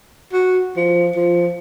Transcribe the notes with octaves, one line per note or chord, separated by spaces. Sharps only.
F#4
F3
F3